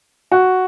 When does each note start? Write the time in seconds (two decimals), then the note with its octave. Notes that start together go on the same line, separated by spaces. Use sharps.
0.32 F#4